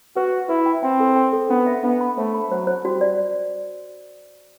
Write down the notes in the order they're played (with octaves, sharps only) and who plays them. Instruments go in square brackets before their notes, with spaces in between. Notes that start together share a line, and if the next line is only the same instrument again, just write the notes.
[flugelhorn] F#4 [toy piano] B4
[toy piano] B4
[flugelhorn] E4 [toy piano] B4
[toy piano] G5
[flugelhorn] C4 [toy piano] G5
[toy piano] A4
G5
A4
[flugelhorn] B3 [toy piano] D4
[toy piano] E5
[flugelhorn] B3 [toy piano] D4
[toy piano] B5
[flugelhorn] A3 [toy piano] C5
[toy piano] B5
[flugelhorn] F#3 [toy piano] C5
[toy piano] C5
[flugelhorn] G3 [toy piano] F#4
[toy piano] D5